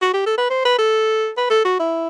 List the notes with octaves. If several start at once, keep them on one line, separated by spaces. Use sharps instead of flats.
F#4
G4
A4
B4
C5
B4
A4
B4
A4
F#4
E4